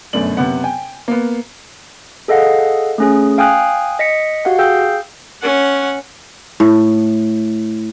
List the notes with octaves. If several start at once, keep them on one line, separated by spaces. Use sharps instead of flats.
G1 F#2 B2 A3 D5 F#7
F#1 C3 B3 F#5
G5 G#5
A#3 B3
G#4 A4 D#5 F5 F#5
A3 C#4 G#4
F5 G5 G#5 D#6 F6 F#6
D#5 B6 C#7
F#4 G4 F5 F#5
G#4 F5 G5 E6 G6
C#4 F#5
A2